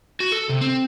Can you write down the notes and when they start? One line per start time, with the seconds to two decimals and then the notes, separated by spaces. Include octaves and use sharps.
0.20 F#4
0.32 A4
0.49 C3
0.61 C4